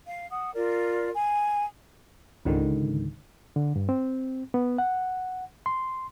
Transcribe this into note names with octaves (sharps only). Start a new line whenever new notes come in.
F5
F#5 D#6
F4 A#4 D5
G#5
C#2 G#2 D3 D#3
D3
G2
C4
B3
F#5
C6